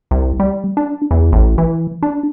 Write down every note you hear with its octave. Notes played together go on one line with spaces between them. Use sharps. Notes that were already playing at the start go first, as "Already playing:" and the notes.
C2
G3
D4
E2
A1
E3
D4